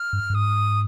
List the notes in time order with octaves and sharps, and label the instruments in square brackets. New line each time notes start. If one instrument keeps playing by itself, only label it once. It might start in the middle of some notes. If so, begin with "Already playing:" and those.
Already playing: [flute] F6
[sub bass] G2
G2
[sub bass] G#2 [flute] D#6